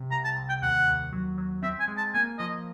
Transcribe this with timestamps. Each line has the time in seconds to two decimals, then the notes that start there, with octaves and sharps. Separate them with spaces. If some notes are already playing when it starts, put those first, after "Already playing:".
Already playing: C3
0.11 C2 A#5
0.24 A5
0.36 C2
0.49 G5
0.62 D#2 F#5
0.87 D#2
1.13 F#3
1.38 F#3
1.63 C4 E5
1.80 G#5
1.88 G#3
1.97 A5
2.14 A#3 G#5
2.39 F3 D#5